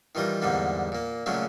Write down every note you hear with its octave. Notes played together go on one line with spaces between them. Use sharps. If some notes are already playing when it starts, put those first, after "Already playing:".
D#3 E3 G3 F4 A#4
E2 G#2 D3 G3 A#3
A#2 A#3
A#2 C#3 F#3 G#3 A3 C#4